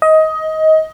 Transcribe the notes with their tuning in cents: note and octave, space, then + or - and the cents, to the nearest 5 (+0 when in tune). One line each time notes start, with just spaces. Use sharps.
D#5 +20